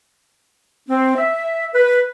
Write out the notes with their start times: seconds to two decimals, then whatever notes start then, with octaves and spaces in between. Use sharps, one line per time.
0.88 C4
1.17 E5
1.73 B4